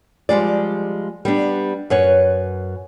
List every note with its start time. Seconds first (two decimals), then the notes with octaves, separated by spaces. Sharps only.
0.29 F3 G3 G#3 D5
1.25 G3 B3 D4
1.90 F#2 B4 C#5